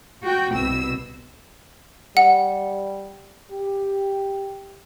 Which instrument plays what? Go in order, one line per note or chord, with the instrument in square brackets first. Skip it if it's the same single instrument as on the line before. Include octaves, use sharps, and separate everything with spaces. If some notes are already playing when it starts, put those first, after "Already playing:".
[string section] F#4 G5
C2 B2 E6
[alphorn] G3 [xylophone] F#5
[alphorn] G4